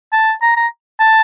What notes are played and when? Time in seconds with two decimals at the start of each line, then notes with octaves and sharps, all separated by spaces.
0.13 A5
0.42 A#5
0.57 A#5
1.00 A5